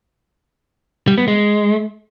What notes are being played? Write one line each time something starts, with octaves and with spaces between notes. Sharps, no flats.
G3
B3
G#3